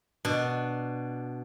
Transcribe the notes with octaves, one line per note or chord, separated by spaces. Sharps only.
B2 D4